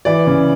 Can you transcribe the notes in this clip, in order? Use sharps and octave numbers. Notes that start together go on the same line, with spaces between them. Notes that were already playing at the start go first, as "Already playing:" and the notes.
E3 D5
C#3